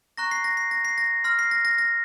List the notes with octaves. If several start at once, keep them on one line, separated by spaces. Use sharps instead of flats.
A#5 C#6 F#6 A#6
C7
A#6
C7
A#6
C7
A#6
C6 F6 A#6
C7
A#6
A#6
A#6